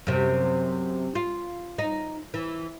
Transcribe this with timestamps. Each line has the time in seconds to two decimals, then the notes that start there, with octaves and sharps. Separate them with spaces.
0.07 F#2 C3
1.15 F4
1.78 D#4
2.34 E3